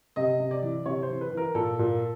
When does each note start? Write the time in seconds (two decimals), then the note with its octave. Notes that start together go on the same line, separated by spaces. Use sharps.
0.16 C3 D#5
0.40 C3
0.51 D5
0.62 E3
0.86 C3 C#5
1.03 C5
1.09 E3
1.21 B4
1.32 E3
1.37 A#4
1.55 A#2 A4
1.79 A#2